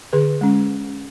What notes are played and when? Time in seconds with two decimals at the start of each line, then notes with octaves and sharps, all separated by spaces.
0.13 D3 G#4 B4
0.41 G#3 C#4